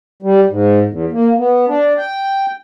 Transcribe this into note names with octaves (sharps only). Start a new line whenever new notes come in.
G3
G#2
E2
A#3
B3
D4
G5